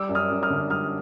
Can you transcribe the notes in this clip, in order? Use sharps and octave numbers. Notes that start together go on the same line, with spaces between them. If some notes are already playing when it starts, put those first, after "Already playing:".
Already playing: G3 D6 E6
F#2
D#6 F6
F#2
D#6 F6
D3
G3 D#6 F6